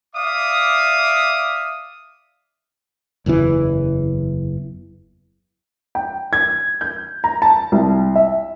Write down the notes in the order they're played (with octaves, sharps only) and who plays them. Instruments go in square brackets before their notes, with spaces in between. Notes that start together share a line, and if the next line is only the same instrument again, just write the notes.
[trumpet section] D5 E5 F5 D6 D#6
[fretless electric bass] F#1 E2 A#2 E3
[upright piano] G5
G#6
G6
A#5
A5
C2
E5